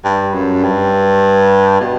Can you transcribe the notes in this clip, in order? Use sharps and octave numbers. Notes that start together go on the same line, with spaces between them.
G2
F#2
G2
B2